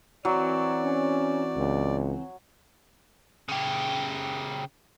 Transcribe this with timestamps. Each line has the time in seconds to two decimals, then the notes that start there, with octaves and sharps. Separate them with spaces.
0.25 E3 F#3 C4 D5
0.84 C#4
1.56 C#2
3.49 C#3 G4